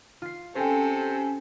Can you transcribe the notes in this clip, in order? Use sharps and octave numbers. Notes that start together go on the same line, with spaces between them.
F4 C7
C3 C#4 A4 C5 G5 G#5